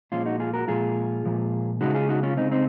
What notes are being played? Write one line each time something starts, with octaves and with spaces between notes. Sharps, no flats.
A#2 F3 G#3 C#4 F4
D#4 F#4
F4 G#4
F#4 A#4
A#2 F3 G#3 F4 G#4
A#2 F3 G#3
C#3 G#3 D#4 F#4
F4 G#4
D#4 F#4
C#4 F4
C#3 G#3 C4 D#4
C4 D#4